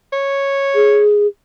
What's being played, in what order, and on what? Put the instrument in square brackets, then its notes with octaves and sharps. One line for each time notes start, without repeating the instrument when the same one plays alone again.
[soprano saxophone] C#5
[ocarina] G#4